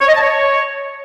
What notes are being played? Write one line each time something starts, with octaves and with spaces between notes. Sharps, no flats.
C#5
D#5
A5
C#5